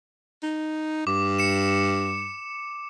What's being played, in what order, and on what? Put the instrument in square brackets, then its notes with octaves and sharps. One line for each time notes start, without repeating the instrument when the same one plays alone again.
[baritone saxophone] D#4
[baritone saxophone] G2 [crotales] D6
[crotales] C#7 E7